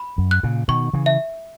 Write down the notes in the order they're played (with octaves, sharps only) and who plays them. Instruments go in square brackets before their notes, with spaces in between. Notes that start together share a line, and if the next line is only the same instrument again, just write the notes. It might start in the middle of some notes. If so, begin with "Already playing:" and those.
Already playing: [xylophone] B5
[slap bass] F#2
[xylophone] F#6
[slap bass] A#2 C#3
[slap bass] B2 D#3 [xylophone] C#6
[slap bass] C#3 E3
[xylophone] E5